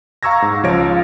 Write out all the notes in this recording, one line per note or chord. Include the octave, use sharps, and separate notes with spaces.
F5 A#5 C#6 E6 G#6 A#6
G#2
C#2 F3 C#5 F5 A#6 D7